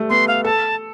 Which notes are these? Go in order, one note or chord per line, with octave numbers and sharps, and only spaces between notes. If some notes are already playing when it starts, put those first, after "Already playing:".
Already playing: G3 A3
B3 C6
F5
A4 A5